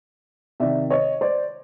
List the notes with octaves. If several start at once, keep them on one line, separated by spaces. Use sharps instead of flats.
C3 D#3 D5 E5
C#5 D#5
C5 D5